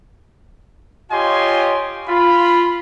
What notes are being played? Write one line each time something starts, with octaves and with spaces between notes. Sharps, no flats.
F4 G4 C#5 D#5 G#5 C6
F4 B5